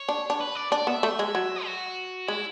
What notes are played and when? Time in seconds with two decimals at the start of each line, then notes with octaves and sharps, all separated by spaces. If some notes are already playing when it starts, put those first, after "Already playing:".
Already playing: C#5
0.09 D4
0.30 D4
0.41 B4
0.55 D5
0.72 D4 D5
0.87 B3 E5
1.03 A3
1.19 G#3
1.35 F#3
1.65 F#4
2.28 G#3 E4